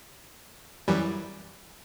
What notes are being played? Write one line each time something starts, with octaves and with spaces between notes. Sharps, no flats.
F#2 E3 G3